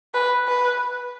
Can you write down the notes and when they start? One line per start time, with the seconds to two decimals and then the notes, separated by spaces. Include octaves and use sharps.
0.14 B4
0.48 B4